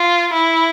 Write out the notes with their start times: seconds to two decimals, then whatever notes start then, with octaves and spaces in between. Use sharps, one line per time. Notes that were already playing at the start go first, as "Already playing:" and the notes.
Already playing: F4
0.32 E4